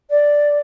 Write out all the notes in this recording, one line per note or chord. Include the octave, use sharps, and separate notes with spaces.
D5